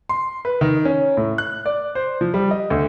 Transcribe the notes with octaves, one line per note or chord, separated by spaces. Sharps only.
C6
B4
D#3
C#4
A2
F#6
D5
C5
F3
G3
D#5
D2